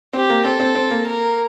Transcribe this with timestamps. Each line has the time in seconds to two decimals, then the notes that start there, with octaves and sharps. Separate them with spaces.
0.13 C4 G4
0.30 A#3
0.45 C4 A4
0.60 C4
0.75 C4
0.90 A#3
1.07 A#4